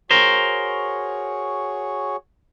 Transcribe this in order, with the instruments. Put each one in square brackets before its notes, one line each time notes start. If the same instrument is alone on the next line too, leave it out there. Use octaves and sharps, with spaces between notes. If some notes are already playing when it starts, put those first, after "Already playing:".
[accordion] F#4 G#4 C#5 [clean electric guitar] A#4 C5